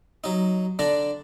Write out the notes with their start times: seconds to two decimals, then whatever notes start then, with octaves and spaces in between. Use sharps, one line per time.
0.24 F#3 D#4
0.79 D3 D4 A#5